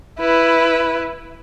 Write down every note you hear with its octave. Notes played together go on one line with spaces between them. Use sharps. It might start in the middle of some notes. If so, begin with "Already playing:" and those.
E4 B4